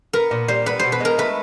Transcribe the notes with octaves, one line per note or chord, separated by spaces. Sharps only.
B3 A#4
A#2
G3 C5
B3 B4
B2 C5
B4
G#3 A#4
A3 B4